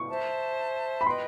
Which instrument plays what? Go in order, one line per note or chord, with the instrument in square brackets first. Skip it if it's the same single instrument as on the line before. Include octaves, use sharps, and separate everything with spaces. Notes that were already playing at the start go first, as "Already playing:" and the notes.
Already playing: [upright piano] C#6
[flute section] C5 E5 A5
[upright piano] B5
[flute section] B4 D#5 G5 [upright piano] C6